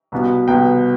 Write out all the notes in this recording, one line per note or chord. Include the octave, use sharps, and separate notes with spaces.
C2 B2 B3
C2 B2 B3 G5